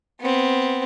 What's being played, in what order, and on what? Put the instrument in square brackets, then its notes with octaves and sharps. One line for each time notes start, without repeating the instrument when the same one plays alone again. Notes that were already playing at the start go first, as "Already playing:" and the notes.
[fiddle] B3 C4